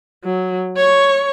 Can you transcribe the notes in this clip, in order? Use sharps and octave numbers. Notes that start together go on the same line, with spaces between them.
F#3
C#5 C#6